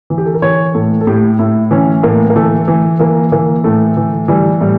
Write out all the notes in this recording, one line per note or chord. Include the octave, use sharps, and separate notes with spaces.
E3
G4
A4
A#4
E3 C#5
A2 A4
A4
A2 G4
A2 E4
E3 C#4
A2 A#3
A#3
E3 A3
E3
E3 A#3
E3 A#3
A2 A3
E3
E3 G3
A2 G3